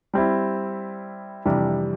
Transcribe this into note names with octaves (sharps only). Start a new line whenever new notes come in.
G3 C4 E4
F2 C3 E3 G3 D4